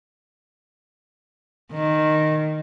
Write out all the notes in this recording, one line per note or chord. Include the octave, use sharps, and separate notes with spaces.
D#3